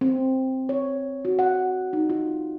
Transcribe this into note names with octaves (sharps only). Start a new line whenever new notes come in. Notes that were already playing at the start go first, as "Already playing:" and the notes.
C4
C#5
F#4
F#5
D#4
F4